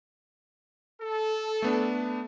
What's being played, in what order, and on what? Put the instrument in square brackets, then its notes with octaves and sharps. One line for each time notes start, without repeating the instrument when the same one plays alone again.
[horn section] A4
[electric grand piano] A3 B3 D4